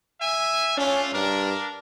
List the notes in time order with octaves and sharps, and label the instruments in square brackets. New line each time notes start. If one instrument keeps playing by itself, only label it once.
[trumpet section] E5 G#5
[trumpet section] A3 D4 F4 [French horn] C#4
[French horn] G2 [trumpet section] D4 A#4